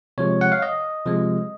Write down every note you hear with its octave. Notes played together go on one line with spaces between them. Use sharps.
C3 F3 G#3 C#5
F#5
F5
D#5
C3 F3 G#3